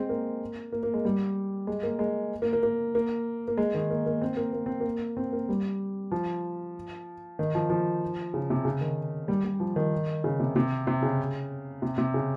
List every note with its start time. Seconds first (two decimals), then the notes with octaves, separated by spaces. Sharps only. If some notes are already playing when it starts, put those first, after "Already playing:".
Already playing: G#3 C4
0.09 A#3
0.72 A#3
0.83 A#3
0.94 G#3
1.05 G3
1.67 G#3
1.83 A#3
1.99 G#3
2.42 A#3
2.53 A#3
2.63 A#3
2.95 A#3
3.48 A#3
3.57 G#3
3.75 D#3
3.90 A#3
4.06 A#3
4.22 C4
4.37 A#3
4.53 A#3
4.66 C4
4.80 A#3
5.17 C4
5.33 A#3
5.49 G3
6.12 F3
7.39 D#3
7.55 F3
7.70 F3
8.34 C#3
8.50 C3
8.65 C#3
8.81 D#3
9.28 G3
9.45 G3
9.60 F3
9.76 D#3
10.24 C#3
10.40 C3
10.56 C3
10.87 C3
11.03 C#3
11.82 C3
11.98 C3
12.14 C#3